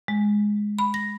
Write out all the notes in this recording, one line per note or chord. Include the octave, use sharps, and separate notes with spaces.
G#3
B5
A#6